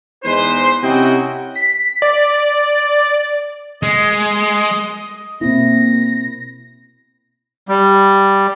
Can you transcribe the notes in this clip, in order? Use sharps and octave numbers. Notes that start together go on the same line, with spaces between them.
E2 G#3 D#4 B4 C5
C3 C#4 E4 F#4 D#5 G5
B6
D5
G#3 D#5
B2 A#3 C4 E4 A#6
G3